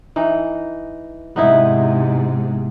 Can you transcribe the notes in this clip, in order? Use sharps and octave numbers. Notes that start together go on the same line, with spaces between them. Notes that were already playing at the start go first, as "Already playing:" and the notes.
E3 D#4
G#2 C3 B3 D#4 E4